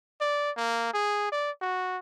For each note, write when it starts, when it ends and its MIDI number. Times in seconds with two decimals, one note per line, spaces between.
0.21 0.51 74
0.57 0.89 58
0.93 1.31 68
1.32 1.51 74
1.61 1.98 66